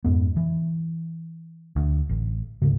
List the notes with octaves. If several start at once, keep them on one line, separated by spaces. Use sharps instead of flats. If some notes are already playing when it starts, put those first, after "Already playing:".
F2 G#2 B3
E3
D2
A1
D2 G#2 C#3